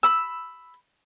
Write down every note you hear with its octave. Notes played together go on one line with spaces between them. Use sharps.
B5 E6